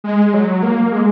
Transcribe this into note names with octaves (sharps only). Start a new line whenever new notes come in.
G#3
F#3
A#3
G#3